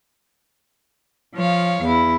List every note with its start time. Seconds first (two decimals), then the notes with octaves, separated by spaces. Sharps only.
1.35 F3 C#5 F5
1.83 E2 E4